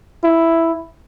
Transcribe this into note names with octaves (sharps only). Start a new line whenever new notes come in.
E4